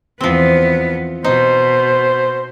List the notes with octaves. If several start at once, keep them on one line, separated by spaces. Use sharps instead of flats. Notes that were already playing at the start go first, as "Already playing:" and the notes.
E2 F3 B3 C4
B2 D#4 C5